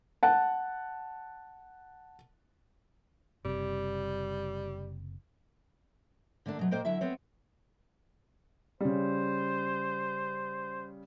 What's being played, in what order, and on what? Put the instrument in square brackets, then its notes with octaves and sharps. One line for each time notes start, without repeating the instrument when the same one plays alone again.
[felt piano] F#5 A5
[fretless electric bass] F#1 C3 [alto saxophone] G3
[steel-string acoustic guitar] D3 A3 A#3 D4
B2 F#3
A#2 A#3 C5 D#5 G5
D3 F#3 E4 E5
B3 C4 C#5
[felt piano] C#3 G3 [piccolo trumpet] C5